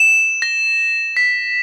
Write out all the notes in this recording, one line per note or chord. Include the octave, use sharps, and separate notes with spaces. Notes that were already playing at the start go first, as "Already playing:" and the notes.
Already playing: E7
A#6
B6